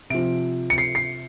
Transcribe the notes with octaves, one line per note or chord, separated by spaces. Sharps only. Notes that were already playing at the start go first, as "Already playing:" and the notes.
C3 F3 D7
C#7
C7
C7